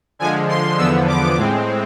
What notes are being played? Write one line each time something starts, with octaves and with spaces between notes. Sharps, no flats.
D3 F3 G#3 G#5
C6
E2 D3 F3 B3 E6
D6
A2 G#3 C4